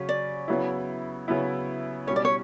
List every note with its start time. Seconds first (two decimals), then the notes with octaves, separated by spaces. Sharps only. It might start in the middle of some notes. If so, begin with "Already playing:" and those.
Already playing: C#3 F#3 C#4
0.09 D5
0.48 C#3 F#3 B3 E4
1.28 C#3 F#3 B3 E4
2.07 B2 G3 C#4 C#5
2.16 D5
2.25 C#5